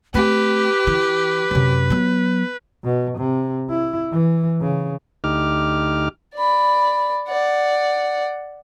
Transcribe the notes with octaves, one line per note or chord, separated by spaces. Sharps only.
A3 C4 G4 B4
E3
F#2 C3
F#3 B3
B2
C3
E4
E3
C#3
D2 D#4 G4 D6 F6
D5 B5
D5 F#5